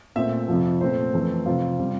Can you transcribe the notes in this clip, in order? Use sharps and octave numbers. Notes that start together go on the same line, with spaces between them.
A#2 A3 C4 E5
F2 C3 F3
A#2 A3 C4 C5
F2 E3 A3 C4
F2 C3 F3 C4 F4
C3 G3 C4